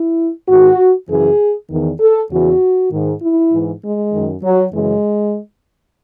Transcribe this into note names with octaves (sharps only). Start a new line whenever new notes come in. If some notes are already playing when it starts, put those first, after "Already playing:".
Already playing: E4
G#2 D#3 F#4
F#2 C#3 E3 G#4
E2 D#3
A4
E2 C#3 E3 F#4
G#2 D#3
E4
G#2 E3
G#3
F#2 D#3
F#3
F#2 C#3 E3 G#3